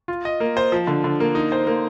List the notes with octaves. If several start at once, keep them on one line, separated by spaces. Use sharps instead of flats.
F4
D#5
A#3
C5
F3
D3
D3
A#3
D#4
C5
A#3